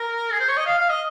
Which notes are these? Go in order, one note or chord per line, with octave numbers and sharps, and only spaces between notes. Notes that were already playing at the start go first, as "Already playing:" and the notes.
Already playing: A#4
G#4
C5
C#5
D#5
F5
F5
D#5